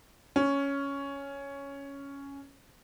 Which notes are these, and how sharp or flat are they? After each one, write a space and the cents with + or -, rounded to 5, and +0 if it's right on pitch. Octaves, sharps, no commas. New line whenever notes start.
C#4 +5